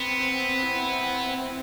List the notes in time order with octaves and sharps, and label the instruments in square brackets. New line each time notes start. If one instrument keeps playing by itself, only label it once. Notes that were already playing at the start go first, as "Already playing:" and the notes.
Already playing: [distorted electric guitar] B3 [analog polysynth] C4
[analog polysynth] C4
E4
C4